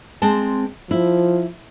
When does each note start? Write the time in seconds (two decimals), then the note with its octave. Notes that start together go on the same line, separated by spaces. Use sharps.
0.22 G#3 C4 A5
0.91 F3 E4